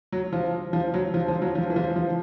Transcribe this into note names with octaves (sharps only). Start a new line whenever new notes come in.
F#3
F3
F3
F#3
F3
F3
F#3
F3
E3
F3
F3